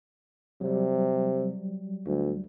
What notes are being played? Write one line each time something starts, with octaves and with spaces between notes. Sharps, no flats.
C3 F#3 G3
D2